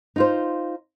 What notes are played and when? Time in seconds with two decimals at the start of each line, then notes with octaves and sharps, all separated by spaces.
0.16 D#4 F4 C5